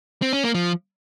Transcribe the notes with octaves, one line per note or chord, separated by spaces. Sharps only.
C4
C#4
A#3
F3